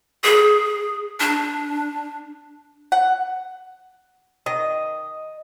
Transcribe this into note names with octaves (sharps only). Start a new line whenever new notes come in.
G#4
D4
F#5
D#3 D#5